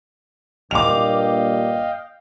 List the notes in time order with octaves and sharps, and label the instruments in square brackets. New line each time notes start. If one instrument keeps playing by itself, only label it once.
[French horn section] G2 A#2 [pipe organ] D#5 F5 G5 [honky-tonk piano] D6 F7